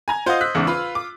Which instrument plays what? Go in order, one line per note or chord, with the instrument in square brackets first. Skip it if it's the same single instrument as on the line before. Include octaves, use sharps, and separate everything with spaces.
[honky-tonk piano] G#5 A#5 G#6
[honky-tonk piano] F4 F5 F#5 [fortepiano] C5 D#5
[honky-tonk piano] E6 F#6 B6
[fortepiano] E2 G#2 C#3
[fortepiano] F4 [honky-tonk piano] B4 F5 B5
[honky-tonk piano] D6